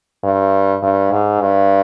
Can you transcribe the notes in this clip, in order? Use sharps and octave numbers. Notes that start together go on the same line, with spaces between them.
G2
G2
G#2
G2